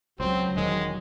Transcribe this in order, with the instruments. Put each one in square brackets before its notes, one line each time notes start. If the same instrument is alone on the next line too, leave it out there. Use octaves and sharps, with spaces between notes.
[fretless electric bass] C#2 [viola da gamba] F#3 [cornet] C4 [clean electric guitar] C5
[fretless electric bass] E1 D#3 [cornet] G#3